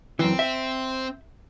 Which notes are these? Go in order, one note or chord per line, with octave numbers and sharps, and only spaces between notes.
F#2 E3 C4
E5